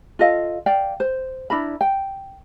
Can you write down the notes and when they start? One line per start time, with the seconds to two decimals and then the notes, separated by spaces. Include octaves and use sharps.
0.19 F4 A4 D#5 F5
0.66 D5 F5 G5
1.00 C5
1.50 D4 E4 A#4 B5
1.81 G5